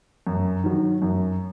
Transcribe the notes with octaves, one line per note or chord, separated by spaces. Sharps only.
F#2
D#3 F#3
F#2